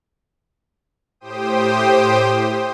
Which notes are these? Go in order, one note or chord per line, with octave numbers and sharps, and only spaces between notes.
A2 G4 C5 G5 D#6